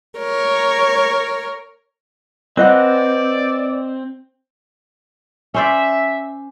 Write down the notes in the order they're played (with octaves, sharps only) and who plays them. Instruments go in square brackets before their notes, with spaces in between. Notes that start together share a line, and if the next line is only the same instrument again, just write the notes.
[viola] A#4 C#5
[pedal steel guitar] C4 [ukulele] B4 D#5 F#5 [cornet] D5
[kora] C#4 C5 D5 [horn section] E5